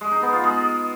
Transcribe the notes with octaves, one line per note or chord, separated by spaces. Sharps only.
G#3
D#4
B3
F4
G#3